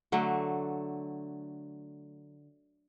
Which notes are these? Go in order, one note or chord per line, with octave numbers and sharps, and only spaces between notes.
D3 F#3 A3